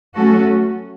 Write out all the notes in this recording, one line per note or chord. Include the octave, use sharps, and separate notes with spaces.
F#3 A3 C#4 F#4 A4